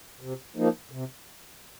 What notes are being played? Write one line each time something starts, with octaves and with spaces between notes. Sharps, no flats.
C3
F3 A#3 D#4
C3